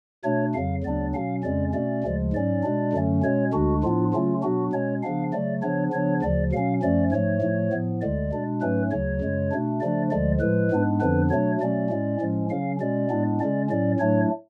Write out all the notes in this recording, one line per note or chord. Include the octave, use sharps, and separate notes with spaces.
B2 A3 D4 C#5
F2 C#3 F#3 F5
D2 C#3 F#3 B3 D4 D5
B2 F#3 C#4 F5
F2 C#3 G#3 C#4 D5
B2 A3 C#4 D5
D2 C#3 F3 G#3
G#2 F#3 C#4 D5
B2 G#3 D4
F#2 D3 F#3 A3 C#4
B2 G#3 C#4 C#5
D2 D3 G#3 D4 F#4
A2 F3 B3 D4 F4
C#3 F#3 A3 C#4 F4
B2 F#3 B3 D4 F#4
B2 G#3 C#4 C#5
C#3 F3 B3 D4 F5
C#3 F#3 A3 D5
C#3 F3 B3 D4 C#5
C#3 F3 B3 D4 C#5
D2 C#3 F3 D5
B2 F#3 C#4 F5
F#2 F3 A3 C#4 D5
G#2 F3 A3 C#5
A2 F3 A3
A2 F3 B3
D2 D3 G#3 D5
B2 G#3 D4
G#2 F#3 A3 C#4 B4
D2 C#3 F#3 C#5
F#2 C#3 G#3
B2 A3 D4
C#3 F3 A3 D4 D5
D2 D3 F3 G#3 D5
A2 F3 G#3 B4
G#2 G#3 B3 D4
F2 D3 F3 B3 D4 B4
B2 F#3 A3 D4 C#5
B2 F#3 A3 C#4 D5
A2 G#3 C#4
A2 F3 G#3 C#4
C#3 F#3 C#4 F5
B2 G#3 C#4 D5
A2 G#3 B3 D4
C#3 G#3 C#4 D5
A2 F#3 C#4 D5
A2 F#3 A3 D4 C#5